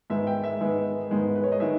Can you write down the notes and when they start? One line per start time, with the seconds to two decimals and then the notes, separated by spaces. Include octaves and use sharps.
0.10 G#2 D#3 G#3 B3 E5
0.27 G5
0.44 E5
0.60 G#2 D#3 G#3 B3
1.11 G#2 D#3 G#3 B3
1.36 B4
1.44 C#5
1.52 D#5
1.60 D#3 G#3 B3 E5